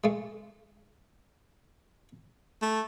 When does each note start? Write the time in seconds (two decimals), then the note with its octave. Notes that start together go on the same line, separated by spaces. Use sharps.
0.04 G#3 A3
2.62 A3